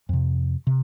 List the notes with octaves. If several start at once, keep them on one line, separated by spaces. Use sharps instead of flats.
F2 C3
C3